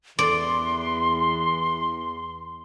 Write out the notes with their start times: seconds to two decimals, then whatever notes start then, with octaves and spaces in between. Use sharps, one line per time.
0.19 E2 D5 C6